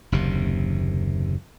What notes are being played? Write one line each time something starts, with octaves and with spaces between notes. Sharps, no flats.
F#1 D#2 C3